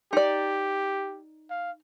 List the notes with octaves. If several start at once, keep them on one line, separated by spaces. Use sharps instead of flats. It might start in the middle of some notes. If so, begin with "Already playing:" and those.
D#4 G4 D5
F5